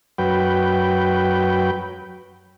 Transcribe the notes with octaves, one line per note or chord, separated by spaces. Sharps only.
F#2 F#3 B4 G5